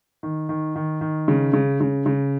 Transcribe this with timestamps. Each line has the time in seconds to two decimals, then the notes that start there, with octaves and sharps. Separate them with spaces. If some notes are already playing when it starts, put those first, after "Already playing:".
0.23 D#3
0.49 D#3
0.76 D#3
1.01 D#3
1.28 C#3
1.53 C#3
1.81 C#3
2.06 C#3